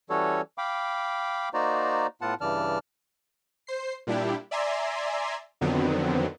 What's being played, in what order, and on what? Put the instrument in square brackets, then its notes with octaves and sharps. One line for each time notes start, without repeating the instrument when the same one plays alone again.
[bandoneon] E3 G3 C#4 F#4 A4 C#5
F5 G5 B5 D6
A#3 D#4 F#4 C5 D5 A#5
A2 B3 F4 F#5 A5
G2 C#3 E3 D5 A5 F6
[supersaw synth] C5 C7
A#2 G3 D4 E4 G4
D5 E5 G#5 A#5 C6
F2 D3 D#3 F#3 B3 C4